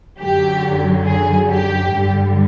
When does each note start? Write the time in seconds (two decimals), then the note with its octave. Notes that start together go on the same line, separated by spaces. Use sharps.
0.19 F#2 D3 F#3 G4
1.05 G#4
1.49 G4
1.92 G2 D3 G3